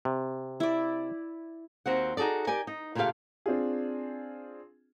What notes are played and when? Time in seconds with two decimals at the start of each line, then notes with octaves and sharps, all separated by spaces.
0.05 C3
0.60 E4 D5
1.86 D#2 C4 F#4 F#5
2.17 D#4 F#4 G#4 A4 D5
2.47 G4 A#4 D5 G#5
2.67 D#4
2.95 A#2 C#3 A3 F4 G4 F5
3.46 C4 D4 F4 G#4